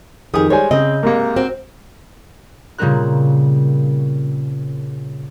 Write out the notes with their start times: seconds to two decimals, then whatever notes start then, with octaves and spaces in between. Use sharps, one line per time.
0.34 F2 D#3 G4 G#4 D#6
0.50 G3 G#3 C5 C#5 G#5
0.71 C#3 C4 D#5
1.03 G#2 C3 A#3 A#4
1.36 C4 F#4
2.78 A#2 C#3 G3 C4 A#4 F#6